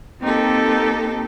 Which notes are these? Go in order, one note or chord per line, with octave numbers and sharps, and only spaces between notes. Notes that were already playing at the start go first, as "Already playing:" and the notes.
A#3 C4 D#4 G4 A4